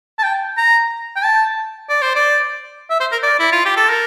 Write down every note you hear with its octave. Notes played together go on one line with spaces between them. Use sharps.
A5
G5
A#5
G5
A5
D5
C5
D5
E5
C5
A#4
D5
E4
F4
G4
A4
A#4